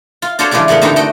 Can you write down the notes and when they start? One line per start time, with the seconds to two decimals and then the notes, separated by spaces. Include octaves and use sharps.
0.22 F4
0.39 D4 F4 F#4 A4 C5 C#5
0.51 C#3 E3 F3 G#3 D4 G4
0.68 A2 C#3 B3 A#4 F#5
0.82 G2 D3 C4 D#4 E4 A#5
0.96 A3 F#4 D#5 G5